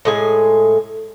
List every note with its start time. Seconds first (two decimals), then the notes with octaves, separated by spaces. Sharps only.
0.05 A2 G#3 G#5